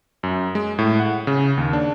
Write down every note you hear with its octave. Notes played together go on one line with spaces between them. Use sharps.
F#2
G#3
A2
F#5
C#3
D#2
D4